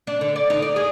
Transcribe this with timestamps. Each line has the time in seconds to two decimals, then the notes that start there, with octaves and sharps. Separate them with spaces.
0.07 D4
0.21 D3
0.36 D5
0.50 D#4
0.62 D5
0.76 G#4